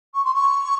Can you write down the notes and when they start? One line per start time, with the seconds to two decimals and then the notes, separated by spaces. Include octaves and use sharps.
0.15 C#6
0.25 C6
0.34 C#6